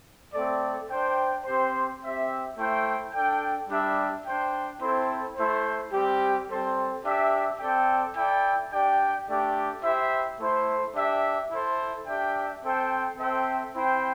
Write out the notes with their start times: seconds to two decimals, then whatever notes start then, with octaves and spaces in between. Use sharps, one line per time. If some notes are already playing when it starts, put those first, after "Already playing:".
0.33 A3 C4 A4 D5
0.90 D4 C5 G5
1.45 C4 G4 C5
2.02 C4 G4 E5
2.58 A3 E4 C5 G5
3.13 D4 A4 D5 G5
3.69 G3 D4 G4 E5
4.25 D4 C5 G5
4.80 C4 E4 A4 C5
5.37 A3 E4 C5
5.92 G3 C4 G4
6.48 G3 C4 A4 C5
7.04 D4 G4 E5
7.59 C4 A4 D5 G5
8.15 E4 A4 D5 G5
8.72 D4 G4 D5 G5
9.27 A3 D4 G4 D5 G5
9.83 E4 G4 C5 E5
10.39 A3 E4 C5
10.95 D4 G4 E5
11.50 E4 A4 C5
12.06 D4 G4 E5 G5
12.63 C4 A4 C5 G5
13.17 C4 A4 C5 E5 G5
13.73 C4 E4 C5 G5